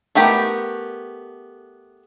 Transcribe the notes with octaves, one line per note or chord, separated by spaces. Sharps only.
A3 B3 G4 A#4